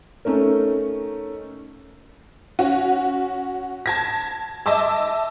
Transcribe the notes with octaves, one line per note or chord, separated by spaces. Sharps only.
A3 C#4 D#4 A#4
C#4 F#4
A5 G#6 A#6
D#5 E5 A5 D6 E6